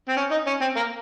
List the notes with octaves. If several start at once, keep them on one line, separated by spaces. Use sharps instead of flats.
C4
C#4
D#4
C#4
C4
A#3